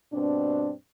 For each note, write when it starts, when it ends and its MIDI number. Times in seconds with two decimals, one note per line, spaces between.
0.13 0.71 43
0.13 0.71 47
0.13 0.71 60
0.13 0.71 62